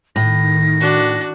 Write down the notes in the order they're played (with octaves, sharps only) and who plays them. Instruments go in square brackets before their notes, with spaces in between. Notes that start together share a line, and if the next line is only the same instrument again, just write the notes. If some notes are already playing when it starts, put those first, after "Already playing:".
[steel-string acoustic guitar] A2 [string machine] D#3 [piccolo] A#6
[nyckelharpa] D4 F#4